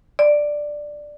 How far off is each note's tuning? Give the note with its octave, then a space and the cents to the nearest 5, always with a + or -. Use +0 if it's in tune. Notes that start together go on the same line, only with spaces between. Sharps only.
D5 +5